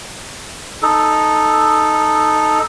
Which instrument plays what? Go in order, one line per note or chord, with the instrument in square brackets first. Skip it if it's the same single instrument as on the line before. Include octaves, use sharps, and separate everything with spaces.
[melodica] D#4 A4